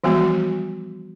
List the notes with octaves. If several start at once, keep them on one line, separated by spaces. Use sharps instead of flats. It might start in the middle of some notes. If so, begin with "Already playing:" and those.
E3 F3 G3 G#3 B3 F#4